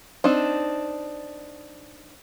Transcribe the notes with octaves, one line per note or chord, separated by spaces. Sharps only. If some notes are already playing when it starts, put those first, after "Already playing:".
C4 D4 D#4